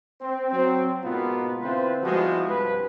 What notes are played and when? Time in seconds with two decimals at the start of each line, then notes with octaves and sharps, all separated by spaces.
0.21 C4
0.51 F#3 C4
1.04 G#2 B2 A#3 B3 F4
1.62 D3 C4 E4 F4 B4 C5
2.03 F3 G3 G#3 B3 E4 F#4
2.50 C2 G2 F3 B4